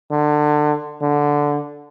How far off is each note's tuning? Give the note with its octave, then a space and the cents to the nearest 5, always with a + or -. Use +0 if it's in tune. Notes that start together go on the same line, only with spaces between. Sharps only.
D3 +25
D3 -5